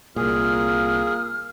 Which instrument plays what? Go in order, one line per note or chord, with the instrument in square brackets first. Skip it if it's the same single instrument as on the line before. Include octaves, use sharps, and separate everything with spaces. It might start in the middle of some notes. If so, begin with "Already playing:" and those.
[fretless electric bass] C2 A#2 [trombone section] A#3 F4 [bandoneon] G#4 [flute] F6